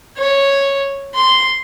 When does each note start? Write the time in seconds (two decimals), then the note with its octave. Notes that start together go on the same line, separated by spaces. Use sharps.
0.18 C#5
1.15 C6